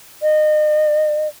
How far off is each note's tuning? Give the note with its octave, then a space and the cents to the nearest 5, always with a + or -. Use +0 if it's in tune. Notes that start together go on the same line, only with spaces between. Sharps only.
D#5 -30